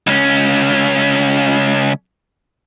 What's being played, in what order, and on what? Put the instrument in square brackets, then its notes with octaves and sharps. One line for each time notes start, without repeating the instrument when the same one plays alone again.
[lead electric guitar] C#2 C#4